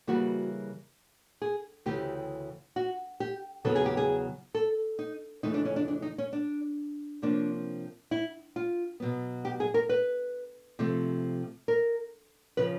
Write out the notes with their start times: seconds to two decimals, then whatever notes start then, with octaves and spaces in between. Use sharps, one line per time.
0.07 C#3 E3 G3 A#3 F#4
1.42 G#4
1.86 D2 C#3 E3 G4
2.76 F#4
3.20 G4
3.65 E2 C#3 F#3 B3 A4
3.75 G#4
3.86 G4
3.97 G#4
4.55 A4
4.99 D#4
5.43 F2 C#3 E3 A3 D#4
5.54 D4
5.65 C#4
5.76 D4
5.88 D4
6.02 D#4
6.18 C#4
6.33 D4
7.22 C3 F3 A#3 C#4 D4
8.11 E4
8.56 F4
9.00 B2 F#3 B3
9.45 G4
9.60 G#4
9.74 A#4
9.89 B4
10.79 C3 F3 A3
11.68 A#4
12.57 C#3 F3 B4